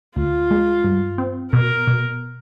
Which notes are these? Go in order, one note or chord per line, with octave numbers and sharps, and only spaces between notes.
D2 F4
G#3
G2
C4
B2 A#4
B2